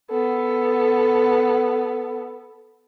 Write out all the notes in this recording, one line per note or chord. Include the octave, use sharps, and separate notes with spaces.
B3 A4